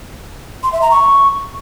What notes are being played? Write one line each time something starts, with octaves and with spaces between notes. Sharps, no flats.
C6
E5
A#5
C#6